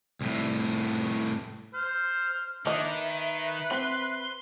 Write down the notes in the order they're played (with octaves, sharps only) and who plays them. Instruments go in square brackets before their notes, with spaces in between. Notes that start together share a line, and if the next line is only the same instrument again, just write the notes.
[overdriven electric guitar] C2 A2
[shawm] C5 [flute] F6
[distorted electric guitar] D#3 [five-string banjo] A#3 D#5 [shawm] D4 [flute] E5
[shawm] B4
[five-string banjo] C4 [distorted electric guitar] B5 C6